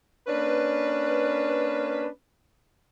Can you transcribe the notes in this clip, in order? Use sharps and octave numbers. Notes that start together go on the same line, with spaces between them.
A#3 C#4 D4 B4